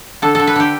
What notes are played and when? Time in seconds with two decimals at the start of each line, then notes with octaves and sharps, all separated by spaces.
0.22 D3 A4
0.35 D3 A4
0.47 B4
0.56 D3 G4